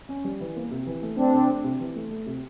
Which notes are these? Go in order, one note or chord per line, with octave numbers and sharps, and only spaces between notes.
C#4
G3
E3
A#3
C3
E3
A3
A3 C4 D4
C3
A3
C3
E3
A3
A3
C3